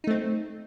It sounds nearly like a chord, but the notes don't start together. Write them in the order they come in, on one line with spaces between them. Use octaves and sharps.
D#4 A3 C4